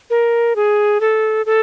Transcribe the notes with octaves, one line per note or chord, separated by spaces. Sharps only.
A#4
G#4
A4
A4